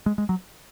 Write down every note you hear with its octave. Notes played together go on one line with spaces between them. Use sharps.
G#3
G#3
F#3